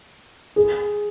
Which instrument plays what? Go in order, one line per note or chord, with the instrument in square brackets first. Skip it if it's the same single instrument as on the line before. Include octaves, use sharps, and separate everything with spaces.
[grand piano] G#4